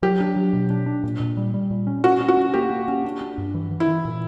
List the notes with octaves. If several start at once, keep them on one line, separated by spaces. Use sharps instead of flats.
F#3 G4
D4
F#3
B2
D4
D4
A#2
A#2
G3
G3
A#2
C#4
C#4 F#4
C#4
F#4
C#4
A#3 G4
A#3
C#4
D4
D4
G2
E3
E3
E4
E3
A#2